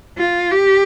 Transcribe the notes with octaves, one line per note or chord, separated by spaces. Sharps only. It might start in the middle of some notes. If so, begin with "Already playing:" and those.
F4
G4